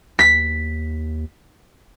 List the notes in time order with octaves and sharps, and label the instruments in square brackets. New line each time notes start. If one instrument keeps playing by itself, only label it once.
[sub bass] D#2 [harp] B6